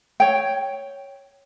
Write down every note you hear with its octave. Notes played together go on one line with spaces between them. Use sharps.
C#5 G5